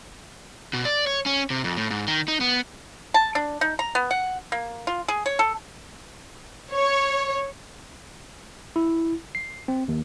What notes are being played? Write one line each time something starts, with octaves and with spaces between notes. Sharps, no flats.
B2
D5
C#5
C#4
C3
F2
A2
G#2
D#3
D#4
B3
A5
D4
D#4
A#5
B3
F#5
A#3
F4
G#4
C#5
A4
C#5
E4
C7
C4
D#2